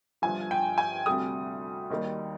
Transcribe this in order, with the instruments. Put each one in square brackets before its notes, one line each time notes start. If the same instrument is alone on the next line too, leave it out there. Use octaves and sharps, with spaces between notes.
[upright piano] G1 G2 F3 G#5
G5
G#5
D2 C3 G3 D#6
D#2 D#3 G3